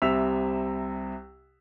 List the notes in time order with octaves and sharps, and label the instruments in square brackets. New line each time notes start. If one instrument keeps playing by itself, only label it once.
[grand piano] C2 C3 E5 E6 B6 F7